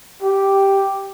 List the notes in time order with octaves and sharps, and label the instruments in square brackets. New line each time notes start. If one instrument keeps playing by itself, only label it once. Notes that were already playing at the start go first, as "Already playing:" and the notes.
[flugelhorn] G4